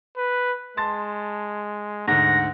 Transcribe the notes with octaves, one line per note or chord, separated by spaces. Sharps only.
B4
G#3 A5 C6 A6
D2 G#2 F#5 A#6